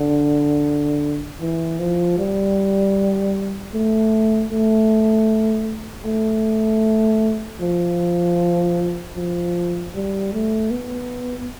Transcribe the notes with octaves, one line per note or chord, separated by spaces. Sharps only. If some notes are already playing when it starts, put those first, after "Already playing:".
Already playing: D3
E3
F3
G3
A3
A3
A3
F3
F3
G3
A3
B3